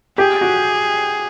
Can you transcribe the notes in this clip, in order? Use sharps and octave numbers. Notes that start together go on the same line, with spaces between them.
G4 G#4
F#4